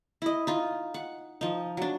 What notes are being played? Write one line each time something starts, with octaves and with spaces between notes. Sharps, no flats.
E4 D#5
D#4 F4
F#5
F3 D#4
F#3 D4